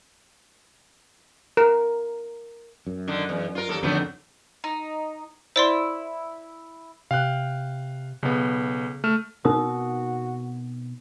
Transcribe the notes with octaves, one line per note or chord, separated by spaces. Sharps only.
A#4
F#2
D3 D#3
E2
F4 A#4
D#2 A4 A#4
F2 D3 D#3 F#3 A3 B3
D#4
E4 C5 D5 C6
C3 F5 G5 F#6
B1 C#3 B3
A3 F6 E7
B2 B3 C4 D#4 F#4 A#4 D#6